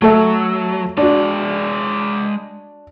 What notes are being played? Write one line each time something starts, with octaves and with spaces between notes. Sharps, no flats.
F#3 A3 A4 E5
G#3 D4 F#4 D5